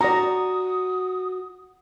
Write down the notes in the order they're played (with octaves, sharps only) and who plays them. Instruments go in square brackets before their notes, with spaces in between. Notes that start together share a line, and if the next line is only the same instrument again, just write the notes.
[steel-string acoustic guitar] F#4 [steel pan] D5 A#5 [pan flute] D#6